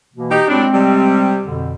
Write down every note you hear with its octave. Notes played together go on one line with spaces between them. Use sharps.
B2 E3 A#3
D#4 G4
A2 F#3 G#3 C4 D4
C3 G3
F2 B2 D3